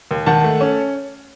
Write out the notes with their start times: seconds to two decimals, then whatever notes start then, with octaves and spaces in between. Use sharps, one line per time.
0.11 D#2
0.26 D#3 F#5 A5
0.44 A3
0.61 C#4